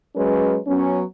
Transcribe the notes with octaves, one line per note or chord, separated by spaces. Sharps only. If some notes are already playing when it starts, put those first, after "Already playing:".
F#3 G#3 C#4 B4
F#3 B3 C#4